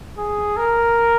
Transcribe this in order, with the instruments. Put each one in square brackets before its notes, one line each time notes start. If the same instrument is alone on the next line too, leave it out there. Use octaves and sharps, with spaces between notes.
[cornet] G#4
A#4